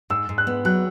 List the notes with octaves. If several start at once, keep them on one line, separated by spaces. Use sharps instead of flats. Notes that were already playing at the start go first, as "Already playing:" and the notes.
G#2 E6
G#2
F#6
B3
F#3 F#6